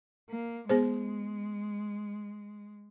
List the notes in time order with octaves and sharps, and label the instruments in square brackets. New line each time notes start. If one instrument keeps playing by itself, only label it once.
[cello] A#3
[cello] G#3 [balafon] B3 G#4 C5